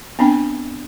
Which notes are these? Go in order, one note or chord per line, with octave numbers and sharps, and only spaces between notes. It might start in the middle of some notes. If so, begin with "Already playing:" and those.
B3 C4 D4 G5